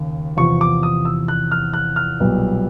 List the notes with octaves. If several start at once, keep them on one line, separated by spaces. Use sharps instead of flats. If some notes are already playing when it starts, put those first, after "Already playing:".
Already playing: D#2 C#3
E2 C3 F3 C#6
D6
D#6
E6
F#6
F6
F#6
F6
B1 A#2 G3 B3